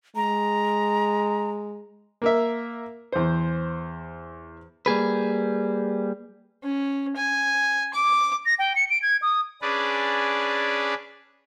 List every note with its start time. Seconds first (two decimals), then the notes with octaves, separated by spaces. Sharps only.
0.16 G#3 A#5
2.22 A#3 A#4 E5
3.12 E2 C5
4.86 G3 A#3 G#4 B4
6.63 C#4
7.16 G#5
7.94 D6
8.46 A#6
8.59 G5
8.76 C#7
8.90 D7
9.02 G#6
9.22 D#6
9.62 C#4 D4 G#4 B4 D5